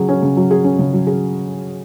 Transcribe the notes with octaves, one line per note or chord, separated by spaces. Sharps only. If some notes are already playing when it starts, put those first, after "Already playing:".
Already playing: C#3 F#3 G#4
C#4
C#3
F#3
G#4
C#4
C#3
F#3
G#4